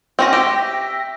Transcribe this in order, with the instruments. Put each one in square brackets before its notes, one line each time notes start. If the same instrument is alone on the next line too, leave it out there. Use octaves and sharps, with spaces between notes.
[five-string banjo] C4 C#4 F#4 [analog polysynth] G5 A#6
[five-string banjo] G4 [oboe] E5